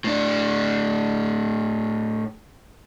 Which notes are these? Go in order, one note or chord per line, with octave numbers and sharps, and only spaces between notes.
A2 D4